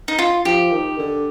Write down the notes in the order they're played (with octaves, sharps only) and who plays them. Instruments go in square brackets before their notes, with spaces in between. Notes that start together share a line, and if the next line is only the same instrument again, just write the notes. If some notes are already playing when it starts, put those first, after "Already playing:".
[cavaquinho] D#4
F4
[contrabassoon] F3 [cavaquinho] G4
[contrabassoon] D#3
D3